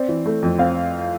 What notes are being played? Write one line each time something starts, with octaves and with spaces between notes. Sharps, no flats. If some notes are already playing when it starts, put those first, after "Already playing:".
Already playing: C4 D5
E3
A3
F2
C4 F5